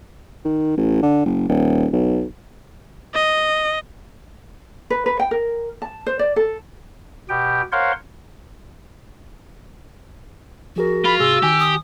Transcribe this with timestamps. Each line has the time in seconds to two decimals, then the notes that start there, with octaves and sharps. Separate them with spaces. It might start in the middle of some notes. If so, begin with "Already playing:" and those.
0.45 D#3
0.77 A1
1.02 D3
1.25 F#1
1.49 D#1
1.92 B1
3.14 D#5
4.90 B4
5.06 B4
5.20 G5
5.31 A#4
5.82 A5
6.07 C5
6.19 D5
6.36 A4
7.29 B2 G4 G5
7.72 A#4 C5 C#5 F5 F#5 C6
10.76 F3 F#4 G#4 A#4
11.05 F4 B5
11.20 G#2 C3 G#4 E6
11.43 D#3 G4 G#5
11.60 D#6